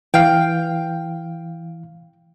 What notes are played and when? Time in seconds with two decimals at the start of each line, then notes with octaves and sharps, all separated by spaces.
0.14 E3 F5 G5